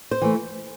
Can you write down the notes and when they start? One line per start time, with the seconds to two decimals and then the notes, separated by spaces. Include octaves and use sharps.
0.11 C5
0.22 E3 A3